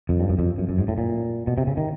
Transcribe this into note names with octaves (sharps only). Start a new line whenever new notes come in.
F2
G2
F#2
F2
F#2
F#2
G#2
A2
A#2
B2
C3
C#3
D#3